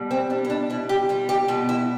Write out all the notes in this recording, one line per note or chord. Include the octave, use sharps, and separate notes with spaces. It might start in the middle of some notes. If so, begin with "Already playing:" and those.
Already playing: B2 G3
C4
G3 D4
E4
D4
B2 E4
G4
G3 F4
G4
B2 F4
E4